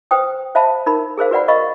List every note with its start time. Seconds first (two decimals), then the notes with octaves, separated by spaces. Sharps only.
0.11 B4 C5 G5 D#6
0.55 C5 E5 F5 A5 B5
0.86 D#4 A#4 B5
1.18 G#4 A#4 C5 F5
1.31 F#4 B4 D5 F#5 B5
1.48 A#4 D#5 F5 B5 C#6